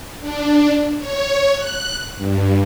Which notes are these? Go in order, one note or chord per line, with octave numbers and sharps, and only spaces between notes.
D4
C#5
F#6
G2